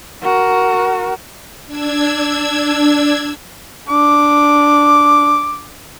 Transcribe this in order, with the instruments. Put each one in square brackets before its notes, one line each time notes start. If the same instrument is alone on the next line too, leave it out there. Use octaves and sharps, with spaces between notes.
[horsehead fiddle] F#4 A#4
[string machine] D4 E6 G#6
[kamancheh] D4 [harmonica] D6